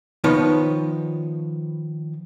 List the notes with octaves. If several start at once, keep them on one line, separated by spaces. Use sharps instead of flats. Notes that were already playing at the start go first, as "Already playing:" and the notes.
D#3 F3 B3 D#4 B4 C#5